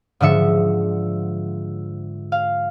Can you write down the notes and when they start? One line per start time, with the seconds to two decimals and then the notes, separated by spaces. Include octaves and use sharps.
0.20 G#2 D3 F3 E5 C#7
2.32 F5